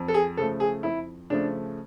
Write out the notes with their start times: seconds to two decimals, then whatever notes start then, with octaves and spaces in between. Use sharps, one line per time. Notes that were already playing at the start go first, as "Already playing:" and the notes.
Already playing: F2
0.08 A4
0.14 G#4
0.37 C#3 F3 A3 A4
0.60 G#4
0.83 F2 E4
1.30 C#3 F3 A3 D4